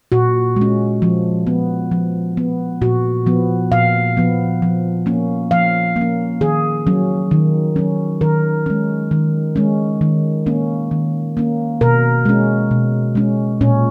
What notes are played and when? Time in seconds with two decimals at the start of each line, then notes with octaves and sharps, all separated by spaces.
0.12 A#2 F#4
0.56 G#3
0.61 C#4
1.02 F3
1.47 B3
1.91 F3
2.37 B3
2.82 A#2 F#4
3.26 F3 B3
3.72 A#2 F5
4.17 F3 B3
4.62 F3
5.06 A#3 C#4
5.51 F3 F5
5.96 A#3
6.01 C#4
6.41 D#3 G#4
6.87 F#3 C#4
7.31 D#3
7.76 F#3 C#4
8.21 D#3 A#4
8.66 G#3 C#4
9.11 D#3
9.56 G#3 C#4
10.01 D#3
10.46 A#3 C#4
10.91 D#3
11.37 A#3 C#4
11.81 B2 A#4
12.25 G#3 C#4
12.71 B2
13.15 G#3 C#4
13.61 A#2 C#4